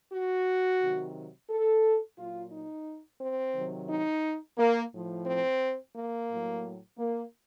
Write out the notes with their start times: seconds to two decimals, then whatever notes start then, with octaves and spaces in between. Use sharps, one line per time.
0.13 F#4
0.81 C3 D#3 F#3
1.50 A4
2.18 A#2 F#3 F4
2.52 D#4
3.21 C4
3.55 C3 D#3 F#3
3.90 D#4
4.58 A#3
4.93 A2 F3
5.27 C4
5.95 A#3
6.29 A2 F#3
6.98 A#3